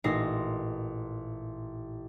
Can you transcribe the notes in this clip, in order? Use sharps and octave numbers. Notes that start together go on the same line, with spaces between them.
A1 A#2 D#4 C6 A#6 C7